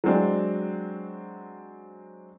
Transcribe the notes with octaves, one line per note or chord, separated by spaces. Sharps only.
F#3 G#3 C4 D4